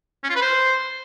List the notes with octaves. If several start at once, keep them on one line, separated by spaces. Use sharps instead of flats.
C#4
F4
B4
C5